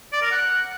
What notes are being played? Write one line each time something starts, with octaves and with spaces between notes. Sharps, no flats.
D5
A#4
F#5